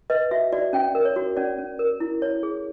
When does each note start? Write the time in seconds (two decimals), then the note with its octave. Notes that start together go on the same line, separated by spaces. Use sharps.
0.10 B4 D#5
0.31 F#4 E5
0.52 F#4 D5
0.73 C#4 G5
0.95 A#4
1.05 C#5
1.16 F#4
1.37 C#4 D5
1.58 C#4
1.79 A#4
2.00 E4
2.22 C#5
2.43 G#4